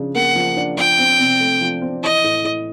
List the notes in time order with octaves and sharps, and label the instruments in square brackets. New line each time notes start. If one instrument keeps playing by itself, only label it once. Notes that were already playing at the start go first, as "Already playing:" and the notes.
Already playing: [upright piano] C#3 F3 D4
[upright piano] A#3 [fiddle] F#5
[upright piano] F3
D4
[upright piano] F3 [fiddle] G5
[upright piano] C4
C3
A3
F3
C4
[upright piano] E3 [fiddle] D#5
[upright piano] A2
A2